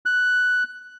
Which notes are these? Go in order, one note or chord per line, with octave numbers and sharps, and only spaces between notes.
F#6